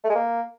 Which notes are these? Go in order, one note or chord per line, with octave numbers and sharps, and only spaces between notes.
A3
G#3
A#3